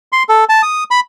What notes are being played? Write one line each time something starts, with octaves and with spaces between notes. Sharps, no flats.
C6
A4
A5
D#6
B5